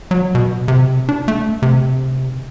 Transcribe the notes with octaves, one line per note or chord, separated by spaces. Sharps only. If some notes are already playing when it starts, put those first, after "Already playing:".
F#3
B2
C3
D4
A3
C3